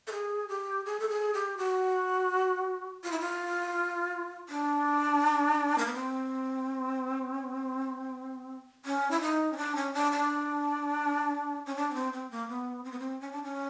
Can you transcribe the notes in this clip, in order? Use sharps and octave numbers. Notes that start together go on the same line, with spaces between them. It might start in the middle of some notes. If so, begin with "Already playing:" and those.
A4
G#4
G4
G#4
A4
G#4
G4
F#4
F4
E4
F4
D4
A#3
B3
C4
C#4
E4
D#4
C#4
D4
C#4
D4
D4
C#4
D4
C#4
C4
C4
A#3
B3
C4
B3
C4
C#4
D4
C#4